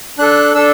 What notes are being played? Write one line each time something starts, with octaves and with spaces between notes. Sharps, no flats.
D4 A4 F#6
D4 A4 E6